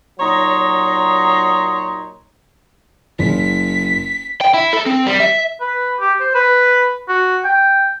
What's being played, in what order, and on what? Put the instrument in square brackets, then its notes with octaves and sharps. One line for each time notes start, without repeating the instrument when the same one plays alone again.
[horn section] A#2 F#3 D#4 C#5 A#5 C6
[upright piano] F#1 [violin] B6
[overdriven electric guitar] G5
E4
A4
C4
G3
E5
[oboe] B4
G4
C5
B4
F#4
G5